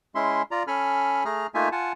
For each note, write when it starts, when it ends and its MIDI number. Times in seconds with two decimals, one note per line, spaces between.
0.15 0.42 56
0.15 0.42 61
0.15 0.42 64
0.15 0.42 76
0.15 0.42 84
0.51 0.63 65
0.51 0.63 74
0.51 0.63 82
0.67 1.24 61
0.67 1.24 69
0.67 1.24 80
0.67 1.24 83
0.67 1.24 89
1.25 1.47 57
1.25 1.47 68
1.25 1.47 82
1.25 1.47 89
1.54 1.69 57
1.54 1.69 58
1.54 1.69 63
1.54 1.69 65
1.54 1.69 76
1.54 1.69 80
1.72 1.93 65
1.72 1.93 78
1.72 1.93 80
1.72 1.93 81